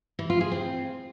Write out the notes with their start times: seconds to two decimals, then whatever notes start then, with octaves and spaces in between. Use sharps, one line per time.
0.19 E3
0.30 F4
0.41 G#4
0.52 C4